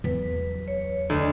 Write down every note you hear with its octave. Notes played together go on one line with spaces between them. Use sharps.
E2 F#3 B4
C#5
D2 D#5